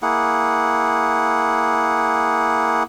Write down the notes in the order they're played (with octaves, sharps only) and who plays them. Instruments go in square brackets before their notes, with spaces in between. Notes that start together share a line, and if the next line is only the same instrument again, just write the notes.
[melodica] A#3 E4 G#4 F#5